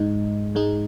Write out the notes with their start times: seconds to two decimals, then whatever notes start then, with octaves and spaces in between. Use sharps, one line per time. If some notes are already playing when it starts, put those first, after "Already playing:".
Already playing: G#2 G#3 D#4
0.55 G#2 G#3 D#4